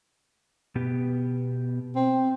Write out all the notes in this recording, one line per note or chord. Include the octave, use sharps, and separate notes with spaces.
B2 B3 G4
C4